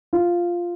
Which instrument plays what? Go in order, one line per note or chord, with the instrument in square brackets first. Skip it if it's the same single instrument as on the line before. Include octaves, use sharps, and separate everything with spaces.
[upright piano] F4